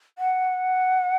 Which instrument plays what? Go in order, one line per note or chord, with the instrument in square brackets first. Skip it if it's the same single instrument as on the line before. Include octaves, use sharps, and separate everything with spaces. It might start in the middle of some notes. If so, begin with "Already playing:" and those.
[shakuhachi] F#5